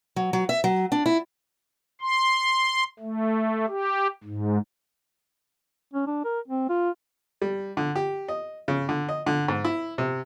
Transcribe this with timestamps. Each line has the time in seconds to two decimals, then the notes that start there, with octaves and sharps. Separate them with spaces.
0.16 F#3
0.33 F#3
0.49 E5
0.64 F#3
0.92 D4
1.06 E4
2.01 C6
2.99 A3
3.68 G4
4.24 G#2
5.94 C#4
6.07 D4
6.25 A#4
6.48 C4
6.69 F4
7.42 G3
7.77 D3
7.96 G4
8.28 D#5
8.68 C#3
8.89 D3
9.09 D#5
9.26 D3
9.48 G#2
9.65 E4
9.98 C3